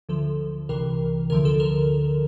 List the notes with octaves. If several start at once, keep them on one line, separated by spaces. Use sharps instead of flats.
D2 D3 F3 A4
C2 C3 E3 A#4
D2 D3 F3 A#4
A4
A#4